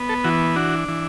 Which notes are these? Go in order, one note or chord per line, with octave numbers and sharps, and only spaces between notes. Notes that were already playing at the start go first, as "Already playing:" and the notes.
Already playing: B3
A4
E3 F#4
D4 F#4
E3